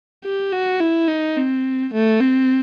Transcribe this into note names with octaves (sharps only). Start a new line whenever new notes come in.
G4
F#4
E4
D#4
C4
A3
C4